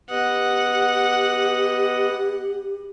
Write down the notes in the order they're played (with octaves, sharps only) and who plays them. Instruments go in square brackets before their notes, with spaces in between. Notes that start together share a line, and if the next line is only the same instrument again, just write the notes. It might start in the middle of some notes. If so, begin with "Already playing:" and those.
[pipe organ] B3 D#5 [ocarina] G4 [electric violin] F#5